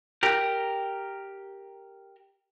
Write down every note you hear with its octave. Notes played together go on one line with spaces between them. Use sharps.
G4 A#4